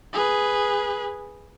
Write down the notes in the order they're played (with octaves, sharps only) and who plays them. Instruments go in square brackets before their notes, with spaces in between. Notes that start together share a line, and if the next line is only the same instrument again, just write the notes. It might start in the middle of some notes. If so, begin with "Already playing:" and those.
[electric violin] G#4 B4